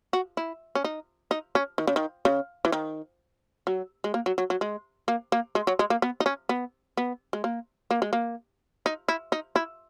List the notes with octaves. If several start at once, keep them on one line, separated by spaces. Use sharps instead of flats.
F#4
E4
C#4
D#4
D#4
C#4
D#3
C#3
D#3
C#3
E3
D#3
F#3
G#3
A#3
F#3
F#3
F#3
G#3
A#3
A#3
G#3
F#3
G#3
A#3
B3
D#4
C#4
B3
B3
G#3
A#3
A#3
G#3
A#3
D#4
E4
D#4
E4